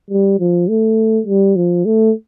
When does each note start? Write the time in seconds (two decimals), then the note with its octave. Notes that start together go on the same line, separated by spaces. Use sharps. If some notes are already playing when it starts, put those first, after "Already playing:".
0.10 G3
0.39 F3
0.68 A3
1.27 G3
1.56 F3
1.85 A3